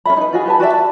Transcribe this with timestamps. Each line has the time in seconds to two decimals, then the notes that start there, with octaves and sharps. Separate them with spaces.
0.06 C#4 B4 E5 B5
0.17 D#4 B4
0.33 F4 F#4 G#4
0.46 G4 B4 A5
0.59 F#4 G4 D5 E5
0.74 A5